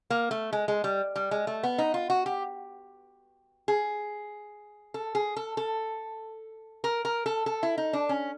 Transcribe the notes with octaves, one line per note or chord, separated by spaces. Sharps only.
A#3
A3
G#3
G#3
G3
G3
G#3
A3
B3
D#4
F4
F#4
G4
G#4
A4
G#4
A4
A4
A#4
A#4
A4
A4
E4
D#4
D4
C#4